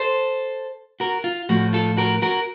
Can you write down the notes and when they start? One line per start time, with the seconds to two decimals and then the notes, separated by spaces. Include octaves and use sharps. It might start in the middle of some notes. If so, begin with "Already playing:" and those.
Already playing: A4 C5
1.00 F#4 A#4
1.24 F4
1.49 A2 F3 A3 F#4
1.73 F4 A4
1.97 F#4 A#4
2.22 F#4 A#4